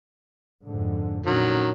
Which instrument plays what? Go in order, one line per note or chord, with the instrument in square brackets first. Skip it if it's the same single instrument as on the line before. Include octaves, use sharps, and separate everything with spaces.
[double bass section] F2 G#2 D3
[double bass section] A#2 D3 C#4 [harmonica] D#3 F#3